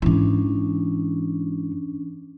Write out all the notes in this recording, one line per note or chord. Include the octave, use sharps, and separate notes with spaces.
G#2 E3 C#4 D4